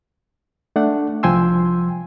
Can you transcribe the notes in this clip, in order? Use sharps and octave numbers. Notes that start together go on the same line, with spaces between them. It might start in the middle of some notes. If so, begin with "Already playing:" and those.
A3 D4 F#5
C2 F3 G5 G#5 C6 E6